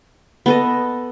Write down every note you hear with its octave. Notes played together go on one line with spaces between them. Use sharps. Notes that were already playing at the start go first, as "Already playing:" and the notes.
B3 A4 D#5